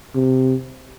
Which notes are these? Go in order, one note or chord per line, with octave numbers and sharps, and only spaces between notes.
C3